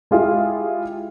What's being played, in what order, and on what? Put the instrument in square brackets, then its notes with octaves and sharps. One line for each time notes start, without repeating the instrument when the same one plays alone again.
[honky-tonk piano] G#3 E4 F4 G4 G#4